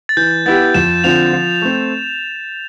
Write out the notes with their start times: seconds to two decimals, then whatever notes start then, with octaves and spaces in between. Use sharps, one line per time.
0.09 A6
0.17 E3 G6
0.46 B3 E4 G4 A6
0.74 F2 E7
1.04 D3 F3 C4 F4 F7
1.33 F3
1.62 A3 C4